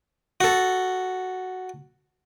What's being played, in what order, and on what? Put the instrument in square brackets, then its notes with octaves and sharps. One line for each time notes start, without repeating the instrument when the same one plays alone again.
[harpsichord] F#4 A4